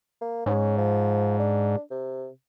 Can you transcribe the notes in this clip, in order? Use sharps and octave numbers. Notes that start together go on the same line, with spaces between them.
A#3
G#2 C#4
F3
D4
C3